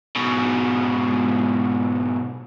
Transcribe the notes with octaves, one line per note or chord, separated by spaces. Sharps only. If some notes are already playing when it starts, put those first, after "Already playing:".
G#2 B2